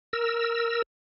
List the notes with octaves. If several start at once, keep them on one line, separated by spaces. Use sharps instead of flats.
A#4 E6